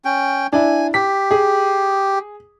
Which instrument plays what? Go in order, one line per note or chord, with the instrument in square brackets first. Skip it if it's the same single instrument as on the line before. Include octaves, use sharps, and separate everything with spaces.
[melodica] C#4 G5
[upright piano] D4 E4 [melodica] G#5
[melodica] G4 [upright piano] B6
[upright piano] G#4